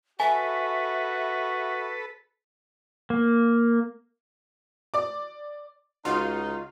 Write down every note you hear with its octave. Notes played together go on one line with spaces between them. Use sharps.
F#4 A4 B4 E5 G#5
A#3
D5 D6
C#2 D#4 F4 F#4 F5 C6